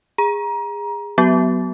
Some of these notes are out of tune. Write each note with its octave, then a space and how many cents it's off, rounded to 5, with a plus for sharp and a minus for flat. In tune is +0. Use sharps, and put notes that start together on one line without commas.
G#4 -20 A#5 +25
F#3 +0 B3 +5 F#4 +45